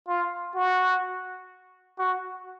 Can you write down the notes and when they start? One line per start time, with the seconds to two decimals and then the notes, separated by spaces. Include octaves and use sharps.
0.08 F4
0.56 F#4
1.99 F#4